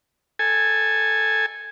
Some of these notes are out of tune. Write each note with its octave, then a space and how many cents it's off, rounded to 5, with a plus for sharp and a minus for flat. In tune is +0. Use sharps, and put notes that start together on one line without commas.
A4 +0 G#5 +0